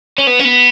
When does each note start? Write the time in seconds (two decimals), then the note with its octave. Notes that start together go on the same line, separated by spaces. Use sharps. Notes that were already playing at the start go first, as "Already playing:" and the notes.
0.18 C#4
0.27 B3
0.40 C#4
0.45 B3